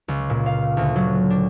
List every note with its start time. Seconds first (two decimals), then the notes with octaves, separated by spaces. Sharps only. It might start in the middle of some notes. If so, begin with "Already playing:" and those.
0.08 C#2
0.30 A#2
0.46 F5
0.77 D2
0.96 F#3
1.30 D4